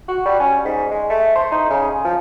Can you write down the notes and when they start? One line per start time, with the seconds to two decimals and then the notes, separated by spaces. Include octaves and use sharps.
0.08 F#4
0.25 G3
0.40 C#4
0.65 G#2
0.91 G#3
1.10 A3
1.35 C5
1.52 D#4
1.70 C#3
1.90 G#4
2.05 F3